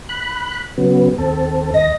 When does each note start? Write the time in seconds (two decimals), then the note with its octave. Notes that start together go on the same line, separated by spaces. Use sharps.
0.09 B5 F#6
0.77 C#3 F#3 B3
1.18 D#2 C4 A4
1.74 D#2 D#5 A#6